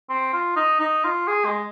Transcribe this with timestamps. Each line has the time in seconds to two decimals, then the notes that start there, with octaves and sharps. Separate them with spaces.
0.09 C4
0.33 F4
0.56 D#4
0.80 D#4
1.04 F4
1.27 G#4
1.45 G#3